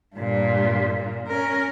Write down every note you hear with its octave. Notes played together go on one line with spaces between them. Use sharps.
G2 A#2
A#2
C#4 A#4